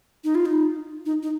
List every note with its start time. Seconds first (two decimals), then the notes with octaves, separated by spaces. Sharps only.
0.24 D#4
0.35 F4
0.45 D#4
1.06 D#4
1.23 D#4